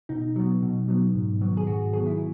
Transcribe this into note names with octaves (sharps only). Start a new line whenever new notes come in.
B2 D#4
F#3 B3
B2
F#3 B3
G#2
D#3 F#3 B3
G#4
G#2 F#4
D#3 F#3 B3 G#4
E4